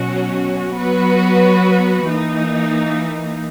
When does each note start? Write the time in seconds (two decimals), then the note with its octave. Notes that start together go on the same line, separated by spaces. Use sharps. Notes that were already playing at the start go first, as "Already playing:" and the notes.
Already playing: B2 F#3 C#4 F#4
0.76 F#3 B3 F#4 B4
2.09 E3 A#3 D#4